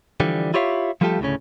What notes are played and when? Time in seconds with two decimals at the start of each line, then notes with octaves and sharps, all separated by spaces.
0.20 D3 E3 F3 G3
0.54 E4 F4 G4 C#5 E5 F5
1.01 F3 G3 A3 F4 G4 A4
1.20 D2 A2 C#3 C#4